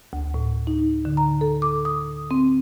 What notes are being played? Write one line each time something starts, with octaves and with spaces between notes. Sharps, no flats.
D2
A2
D#4
D3
A#5
A4
D6
D#6
C4